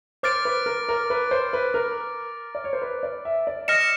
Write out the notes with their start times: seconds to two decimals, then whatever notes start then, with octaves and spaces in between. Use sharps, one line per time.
0.23 C5 D6 F6 A6 D7
0.45 B4
0.66 A#4
0.89 A#4
1.10 B4
1.31 C5
1.53 B4
1.74 A#4
2.55 D5
2.64 C#5
2.73 C5
2.82 B4
3.03 D5
3.25 E5
3.47 D5
3.68 D#5 F6 A#6 C#7 E7